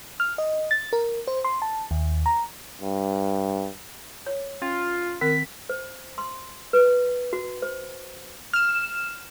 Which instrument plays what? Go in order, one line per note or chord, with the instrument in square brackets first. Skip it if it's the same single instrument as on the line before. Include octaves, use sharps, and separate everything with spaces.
[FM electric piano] F6
D#5
A6
A#4
C5
C6
A5
D#2
A#5
[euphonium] G2
[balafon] C#5
[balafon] C#4 [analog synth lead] F4
[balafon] D#3 C4 A#4 [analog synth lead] B6
[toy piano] C5
C6
B4
F#4
C5
[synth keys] F6 E7